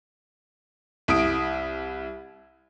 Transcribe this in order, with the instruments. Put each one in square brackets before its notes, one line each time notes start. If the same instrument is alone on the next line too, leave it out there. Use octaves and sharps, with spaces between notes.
[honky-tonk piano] C2 E4 D#6 D7